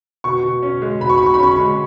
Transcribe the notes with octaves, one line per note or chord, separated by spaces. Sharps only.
B2 C#6
B2
C#4
G#3
B2 B5
C#6
B2 B5
C#6
B5
C#4 C#6
B5
G#3